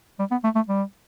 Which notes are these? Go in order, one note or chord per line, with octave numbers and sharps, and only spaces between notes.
G3
B3
A3
A3
G3